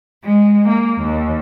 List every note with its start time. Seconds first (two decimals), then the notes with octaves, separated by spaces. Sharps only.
0.25 G#3
0.68 A#3
1.01 D#2